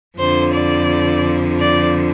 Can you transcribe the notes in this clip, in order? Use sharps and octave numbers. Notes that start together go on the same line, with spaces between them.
F2 D3 F3 C5
D5
D5